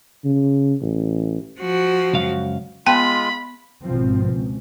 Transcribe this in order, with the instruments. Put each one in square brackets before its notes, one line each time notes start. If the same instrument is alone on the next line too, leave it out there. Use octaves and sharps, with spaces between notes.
[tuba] C#3
A1
[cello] F3 F#4
[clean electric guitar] C#2 F#2 F5
[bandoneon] G#3 F4 [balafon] B3 G5 A5 [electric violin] B5
[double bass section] G#1 B2 F3 C4
C#2